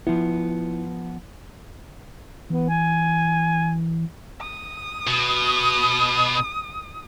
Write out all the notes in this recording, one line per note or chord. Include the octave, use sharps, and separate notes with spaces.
F3 B3 E4
E3 B3
G#5
D#6
B2